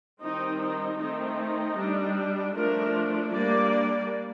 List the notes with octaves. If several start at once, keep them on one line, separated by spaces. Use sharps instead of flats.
D#3 G3 C4 D#4
D#4
D#3 A3 C4 D#4
G3 D4
F3 A3 D4 A#4
G3 A#3 D4 D5